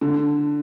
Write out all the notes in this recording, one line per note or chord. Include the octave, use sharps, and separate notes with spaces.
D3